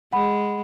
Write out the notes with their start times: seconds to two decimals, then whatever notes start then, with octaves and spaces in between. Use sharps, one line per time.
0.13 G#3 F#5 B5